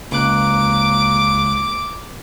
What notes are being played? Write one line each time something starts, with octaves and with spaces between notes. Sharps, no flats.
C#2 A#3 D6 F#6